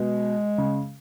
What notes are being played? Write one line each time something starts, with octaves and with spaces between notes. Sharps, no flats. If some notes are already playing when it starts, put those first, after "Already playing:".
Already playing: B2 G#3
C#3